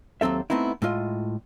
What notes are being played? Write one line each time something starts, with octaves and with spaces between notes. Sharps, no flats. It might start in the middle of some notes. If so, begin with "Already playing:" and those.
D#2 F#3 C4 A4 E5
A3 B3 C4 D#4 E4
A2 G#3 F4 D#5